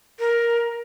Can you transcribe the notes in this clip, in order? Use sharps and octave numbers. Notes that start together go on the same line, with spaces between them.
A#4